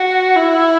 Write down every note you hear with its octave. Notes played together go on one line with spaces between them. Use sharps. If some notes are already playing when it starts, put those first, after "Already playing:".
Already playing: F#4
E4